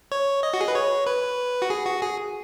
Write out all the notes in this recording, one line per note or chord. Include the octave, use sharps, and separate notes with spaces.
C#5
D#5
F#4
G#4
B4
C#5
B4
F#4
G#4
F#4
G#4